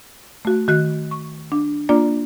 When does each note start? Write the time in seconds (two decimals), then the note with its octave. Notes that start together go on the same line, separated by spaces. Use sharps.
0.45 A3 F#4
0.68 D#3 F#4 F#6
1.11 C#6
1.52 D4
1.89 A#3 D4 F4 D5 A#5